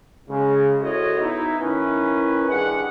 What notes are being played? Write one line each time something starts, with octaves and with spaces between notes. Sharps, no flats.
C#3 G#3
E4 F#4 A4 C5 C#5 D#5
B3 D#4 E4
D#3 C#4 E4 B4
G2 G#4 D#5 F#5